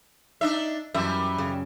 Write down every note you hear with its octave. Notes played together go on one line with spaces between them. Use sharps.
D4 D#4 E5
F#2 E3 G3 E5
C#3